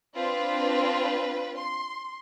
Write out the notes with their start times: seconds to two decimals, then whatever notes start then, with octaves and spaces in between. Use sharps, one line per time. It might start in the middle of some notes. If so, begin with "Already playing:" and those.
0.16 C4 D4 F4 B4
1.57 C6